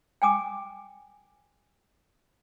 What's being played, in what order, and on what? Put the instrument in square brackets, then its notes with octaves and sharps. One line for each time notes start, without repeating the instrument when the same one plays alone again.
[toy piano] G5 G#5 D6 D#6